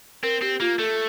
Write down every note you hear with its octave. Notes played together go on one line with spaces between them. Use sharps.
C4 A#4
C4 G4
A#3 F4
A3 A4